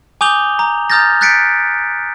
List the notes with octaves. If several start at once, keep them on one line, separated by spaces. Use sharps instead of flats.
G#5 D6 D#6 G6 F7 G7
A#5
A#5 D#6 F6 G6 A6 A#6
F#6 G6 A6 B6 C#7 D7